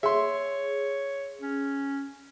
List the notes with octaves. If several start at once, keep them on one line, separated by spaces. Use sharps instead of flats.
G#4 C#5 E5 C6
C#4